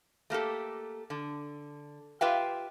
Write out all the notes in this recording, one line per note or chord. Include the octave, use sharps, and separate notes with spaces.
A3 A#3 G4 A4
D3
F4 G4 B4 E5 F5 G5